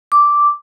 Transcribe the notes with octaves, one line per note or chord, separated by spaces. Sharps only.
D6